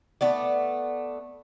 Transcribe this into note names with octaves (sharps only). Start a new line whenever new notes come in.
A3 B3 D5